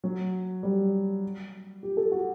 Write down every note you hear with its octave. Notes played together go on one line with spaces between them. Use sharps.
F#3
G3
G4
A4
F#4